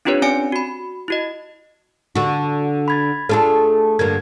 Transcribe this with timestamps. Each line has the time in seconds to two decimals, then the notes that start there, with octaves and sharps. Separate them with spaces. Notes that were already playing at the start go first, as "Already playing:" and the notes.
0.05 C4 D4 F4 G4 B4 C#5
0.22 C4 C#4 D5 G#5 C#7 D7
0.52 F#4 B5
1.08 E4 F#4 D#5
2.15 D3 F#4
2.88 B5 G#6 A6
3.29 A3 D4 F4 G#4 A4
3.99 G2 D3 A#3 G#6